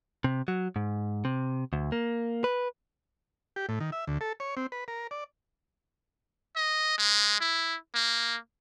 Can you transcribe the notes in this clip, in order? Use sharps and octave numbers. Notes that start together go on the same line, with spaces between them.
C3
F#3
G#2
C3
D2
A#3
B4
G4
A2
D#3
E5
D2
A4
C#5
C4
B4
A#4
D5
D#5
G#3
E4
A#3